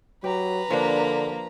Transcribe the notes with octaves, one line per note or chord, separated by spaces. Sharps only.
F#3 G4 B4 A#5
D3 F3 A#3 D4